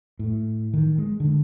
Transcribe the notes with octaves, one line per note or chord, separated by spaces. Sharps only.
A2
D#3
G#3
D3